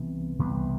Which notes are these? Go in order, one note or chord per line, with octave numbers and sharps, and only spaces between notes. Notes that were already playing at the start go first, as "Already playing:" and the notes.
Already playing: C2 C3 E3 B3
C2 C3 E3 B3